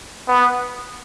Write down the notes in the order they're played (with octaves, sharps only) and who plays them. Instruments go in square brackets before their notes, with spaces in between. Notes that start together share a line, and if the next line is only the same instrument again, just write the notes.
[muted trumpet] B3